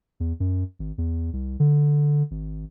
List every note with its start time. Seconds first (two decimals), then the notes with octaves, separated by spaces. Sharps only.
0.20 E2
0.40 F#2
0.79 G#1
0.98 E2
1.33 C2
1.60 D3
2.31 G#1